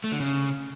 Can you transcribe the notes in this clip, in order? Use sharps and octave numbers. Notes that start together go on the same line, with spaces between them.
A3
D3
C#3